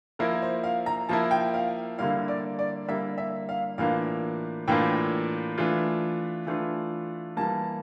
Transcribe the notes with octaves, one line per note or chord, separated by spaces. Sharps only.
F3 A#3 E4 A#4
C5
F5
A#5
F3 A#3 E4 A5
G5
F5
D3 G3 A#3 E4 F5
D5
D5
D3 G3 A#3 E4 E5
E5
F5
A2 E3 A#3 D4 F4 F5
A2 E3 A#3 D4 F4 G5
E3 A3 D4 F4
E3 A3 D4 F4
E3 G3 A#3 A5